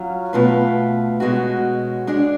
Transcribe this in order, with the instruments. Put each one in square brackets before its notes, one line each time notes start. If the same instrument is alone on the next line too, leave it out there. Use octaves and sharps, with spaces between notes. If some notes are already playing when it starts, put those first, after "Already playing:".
Already playing: [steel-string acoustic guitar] F#3 C#4 F4
B2 A3 F4 B4
B2 G#3 C#4 F#4
G#3 D4 G#4